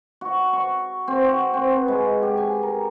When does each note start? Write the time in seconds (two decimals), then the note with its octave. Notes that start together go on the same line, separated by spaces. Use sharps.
0.21 F#4
0.53 C#6
1.08 C4
1.24 F#4
1.54 C4
1.70 B4
1.88 G#3
2.22 G4
2.37 G#5
2.63 A#4